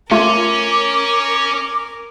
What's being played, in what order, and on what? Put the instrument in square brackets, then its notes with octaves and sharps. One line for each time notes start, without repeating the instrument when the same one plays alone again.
[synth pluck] A3 F4 [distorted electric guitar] C#4 [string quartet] A#4 [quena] D6